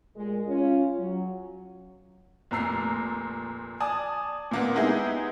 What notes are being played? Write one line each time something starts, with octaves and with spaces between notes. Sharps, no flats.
A#2 G#3
C#4 F4
F#3
F1 A#2 A#5 E6 C7
D5 G#5 A5 D#6
A#2 A#3 B3
G#3 B3 D#4 E4 G4 G#4